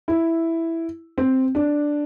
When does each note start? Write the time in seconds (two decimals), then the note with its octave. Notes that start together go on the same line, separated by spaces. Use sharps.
0.08 E4
1.18 C4
1.55 D4